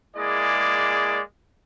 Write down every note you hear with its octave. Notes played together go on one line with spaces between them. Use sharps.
G#3 A#3 E4 G#4 D5